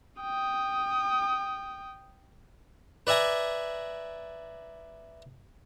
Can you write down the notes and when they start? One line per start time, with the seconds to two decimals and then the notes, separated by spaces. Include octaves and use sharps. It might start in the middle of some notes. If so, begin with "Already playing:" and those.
0.21 G5 D#6
3.07 B4 D5 E5 G#5 A#5